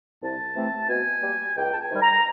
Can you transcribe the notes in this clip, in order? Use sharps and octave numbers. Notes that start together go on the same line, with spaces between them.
C2 A5
C3 E3 A3 C4
B2 G#5
G3 A#3
C#2 G5
A5
G#5
C3 D#3 G3
A#5